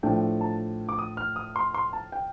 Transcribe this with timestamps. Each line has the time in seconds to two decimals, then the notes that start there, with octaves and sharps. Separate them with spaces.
0.03 A2 F3 A3 D4 G5
0.41 A5
0.89 D6
0.99 D#6
1.17 F6
1.36 D#6
1.56 C6
1.74 C6
1.93 A5
2.12 G5